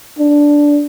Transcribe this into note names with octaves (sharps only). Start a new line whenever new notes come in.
D4